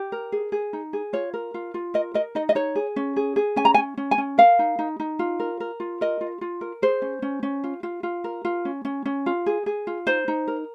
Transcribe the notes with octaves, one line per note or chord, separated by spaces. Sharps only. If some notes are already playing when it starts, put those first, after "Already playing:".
Already playing: G4
A#4
G#4
G#4
D#4
G#4
F4 C#5
A#4
F4
F4
A#4 D#5
A#4 D#5
D#4 D#5
D#5
D#4 C#5
G#4
C#4
G#4
G#4
C#4 G#5
A#5
G#5
C#4
C#4
G#5
C#4
A#4 F5
D#4
D#4
D#4
F4
A#4
A#4
F4
A#4 D#5
F4
F4
A#4
G#4 C5
C#4
C#4
C#4
F4
F4
F4
A#4
F4
C#4
C#4
C#4
F4
G#4
G#4
F4
D#4 C5
D#4
A#4